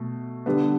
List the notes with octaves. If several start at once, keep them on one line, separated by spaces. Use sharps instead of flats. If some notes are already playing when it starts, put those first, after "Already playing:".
Already playing: B2 A3
D3 G3 B3